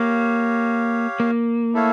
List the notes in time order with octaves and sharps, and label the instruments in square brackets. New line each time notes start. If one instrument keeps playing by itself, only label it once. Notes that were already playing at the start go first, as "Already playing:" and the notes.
Already playing: [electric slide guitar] A#3 [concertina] G4 C#5 F5
[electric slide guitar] A#3
[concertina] A3 E4 A4 C#5 F5